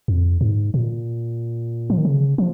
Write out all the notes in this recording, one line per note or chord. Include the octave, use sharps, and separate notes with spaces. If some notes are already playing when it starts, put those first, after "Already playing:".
F2
G#2
A#2
F3
D#3
C#3
F3